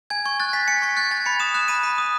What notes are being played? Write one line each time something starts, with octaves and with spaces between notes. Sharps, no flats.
G#5 G#6
C#6 G#6
F#6 A6
G#5 B6
G#5 C#7
C#6 A6
F#6 G#6
G#5 A6
B5 C#7
D#6 E7
F#6 E7
B5 D#7
B5
D#6